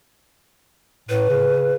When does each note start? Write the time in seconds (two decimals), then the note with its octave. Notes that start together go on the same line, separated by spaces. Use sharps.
1.09 A2 B4
1.29 C#3